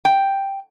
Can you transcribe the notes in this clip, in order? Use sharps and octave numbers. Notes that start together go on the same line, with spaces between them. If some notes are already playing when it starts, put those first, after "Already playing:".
G5